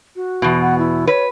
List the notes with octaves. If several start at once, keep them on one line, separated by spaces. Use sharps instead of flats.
F#4
E2 B2
F#5
E4
B4 C#5